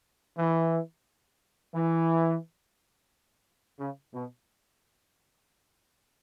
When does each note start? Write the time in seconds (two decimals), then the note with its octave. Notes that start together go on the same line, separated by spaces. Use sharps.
0.38 E3
1.74 E3
3.80 C#3
4.14 B2